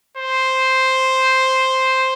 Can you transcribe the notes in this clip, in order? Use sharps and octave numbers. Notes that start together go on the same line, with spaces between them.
C5